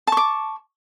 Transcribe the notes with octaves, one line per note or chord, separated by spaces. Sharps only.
A5 C#6 D6